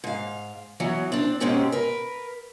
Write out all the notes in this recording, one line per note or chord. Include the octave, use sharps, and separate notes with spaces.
G#2 F5
E3 F#3 B3
C4 D4
G#2 B2 G#3 C4 C#4 G4
A#4 B4